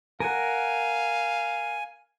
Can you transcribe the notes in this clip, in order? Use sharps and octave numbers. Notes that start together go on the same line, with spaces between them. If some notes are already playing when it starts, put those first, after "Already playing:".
A#4 F5 F#5 G#5